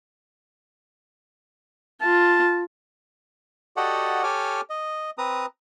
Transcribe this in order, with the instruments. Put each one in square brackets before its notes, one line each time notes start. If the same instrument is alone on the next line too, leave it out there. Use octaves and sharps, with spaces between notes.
[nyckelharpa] F4 [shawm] A5
[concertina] F#4 G4 A4 D5 D#5 F#5
G4 A4 C#5 G#5 D6 F6
D#5
C4 B4 A#5 D#6